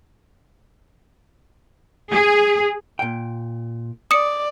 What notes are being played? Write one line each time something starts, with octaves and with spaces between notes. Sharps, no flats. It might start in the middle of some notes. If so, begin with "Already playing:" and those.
G#4
A#2 G5
D5 D#6 C#7